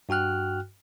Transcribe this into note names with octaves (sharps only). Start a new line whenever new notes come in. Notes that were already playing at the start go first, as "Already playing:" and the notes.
G2 F#4 G5 F6 F#6